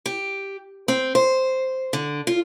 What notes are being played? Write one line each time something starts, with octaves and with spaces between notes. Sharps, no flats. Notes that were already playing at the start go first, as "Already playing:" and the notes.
G4
C4
C5
D3
F4